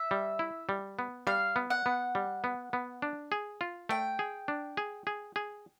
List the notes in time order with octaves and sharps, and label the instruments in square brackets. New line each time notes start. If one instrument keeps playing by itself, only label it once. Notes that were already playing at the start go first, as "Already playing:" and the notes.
Already playing: [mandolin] E5
[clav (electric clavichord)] G3
E4
G3
B3
[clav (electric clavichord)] G3 [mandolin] F5
[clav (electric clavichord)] B3
[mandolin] F#5
[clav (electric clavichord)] B3
G3
B3
B3
D4
G#4
F4
[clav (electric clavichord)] A3 [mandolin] G5
[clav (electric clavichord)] G#4
D4
G#4
G#4
G#4